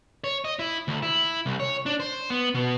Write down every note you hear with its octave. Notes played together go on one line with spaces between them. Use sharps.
C#5
D#5
E4
D2
E4
C2
C#5
D4
C5
B3
B2